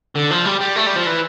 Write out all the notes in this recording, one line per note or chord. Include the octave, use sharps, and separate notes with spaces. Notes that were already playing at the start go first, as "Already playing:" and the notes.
D3
F3
G3
G3
A3
G3
F3
E3